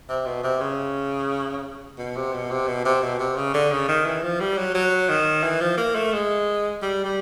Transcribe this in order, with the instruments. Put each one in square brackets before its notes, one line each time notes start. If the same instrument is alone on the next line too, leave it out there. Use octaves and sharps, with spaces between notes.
[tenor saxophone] C3
B2
C3
C#3
B2
C3
B2
C3
B2
C3
B2
C3
C#3
D3
C#3
D#3
E3
F3
G3
F#3
F#3
D#3
E3
F3
A#3
A3
G#3
G3
G3